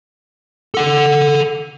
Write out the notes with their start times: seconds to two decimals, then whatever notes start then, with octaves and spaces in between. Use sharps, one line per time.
0.74 A4 F#5